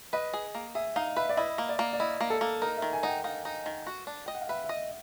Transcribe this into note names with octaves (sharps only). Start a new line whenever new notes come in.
B4 D#5
G#4
A#3
G#4 E5
D#4 F5
B4 E5
D5
E4 D#5
A#3
D5
A#3
D5
E4 D#5
A#3
A4
A#3
D#4 A#4
D#3 E5
G#5
D#4 F#5
G5
D#4 F5
D#4
D#3
F#4
D4
D#5 G5
F#5
F5
B4 E5
E5
D#5